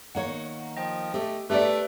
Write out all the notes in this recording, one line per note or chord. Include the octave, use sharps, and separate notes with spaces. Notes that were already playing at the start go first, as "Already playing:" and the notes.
D#3 A#3 C#5 F#5
F3 D#5 G5
A3 G4
A3 G4 A#4 B4 D5 E5